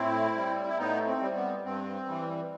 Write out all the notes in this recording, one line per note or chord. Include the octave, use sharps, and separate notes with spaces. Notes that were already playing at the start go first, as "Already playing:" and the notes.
Already playing: A2 C4 E4
G3
E4
A2 B3 D#4
C4
G3
B3
G2 C4
E3 G3